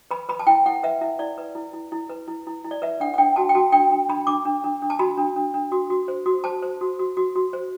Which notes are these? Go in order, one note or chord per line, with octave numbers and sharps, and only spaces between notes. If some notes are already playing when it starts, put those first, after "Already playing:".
B4 B5
B4 B5
A5
E4 G5
E4 F#5
B4 E5
E4 E5
E4 D5
B4
E4
E4
E4
B4
E4
E4
E4
D5
B4 E5
D4 F#5
F#5
D4 G5
F#4 A5
G5
F#4 A5
D4 G5
D4
D4 B5
D4 D6
D4
D4
D4
A5
F#4 B5
D4
D4
D4
F#4
F#4
C5
F#4
C5 A5
C5
F#4
F#4
F#4
F#4
C5